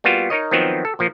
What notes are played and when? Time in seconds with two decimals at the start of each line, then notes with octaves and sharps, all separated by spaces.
0.04 G3 A#3 B3 F4 F#4
0.30 D#4 A#4 C#5 D#5
0.51 D#3 F3 F#3 B3 C4 D#4
0.85 A4
0.99 A#2 F3 A#3